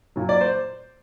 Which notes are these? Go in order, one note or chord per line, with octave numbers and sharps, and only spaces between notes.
A#2 F#3
D5
C5